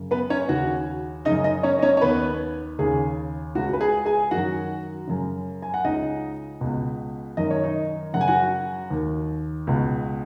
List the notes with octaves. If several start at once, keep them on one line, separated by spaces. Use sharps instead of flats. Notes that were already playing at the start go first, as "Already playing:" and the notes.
Already playing: F#2 C#3
B3 B4
C#4 C#5
D#2 C#3 F#4 F#5
F#2 C#3 D#4 D#5
D#4 D#5
C#4 C#5
D#5
C#4 C#5
C#5
D#2 D#3 B3 B4
D#2 C#3 G#4
C#2 C#3 F#4
B4
G#4
G#4 G#5
F#2 D#3 F#4 F#5
F#2 C#3
G#5
F#5
C#2 C#3 D#4 D#5
C#2 B2
F#2 D#3 D#5
C#5
D#4 D#5
F#2 C#3 F#5
G#5
F#4 F#5
D#2 D#3
C#2 B2